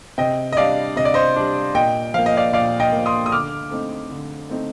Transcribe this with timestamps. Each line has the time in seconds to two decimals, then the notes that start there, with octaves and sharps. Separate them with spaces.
0.18 C3 D#5 G5
0.53 D#5
0.57 G3 D4 D5 F5
0.96 C3 D#5
1.05 D5
1.14 C5 D#5
1.36 G3 D4
1.75 A#2 D#5 G5
2.14 F3 A#3 F5
2.26 D#5
2.37 D5 F5
2.53 A#2 D5 F5
2.80 D#5 G5
2.92 A#3
2.97 F3
3.06 C6 D#6
3.26 D#6
3.32 D3 D6 F6
3.71 A3 C4 D#4
4.11 D3
4.50 A3 C4 D#4